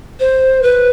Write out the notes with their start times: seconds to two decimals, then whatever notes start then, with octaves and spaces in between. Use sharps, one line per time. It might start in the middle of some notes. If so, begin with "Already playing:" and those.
0.20 C5
0.63 B4